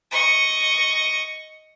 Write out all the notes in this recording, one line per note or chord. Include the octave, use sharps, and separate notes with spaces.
D#5 C#6